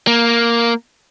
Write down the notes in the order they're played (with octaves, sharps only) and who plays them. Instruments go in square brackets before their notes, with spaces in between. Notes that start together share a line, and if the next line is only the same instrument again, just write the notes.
[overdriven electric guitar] A#3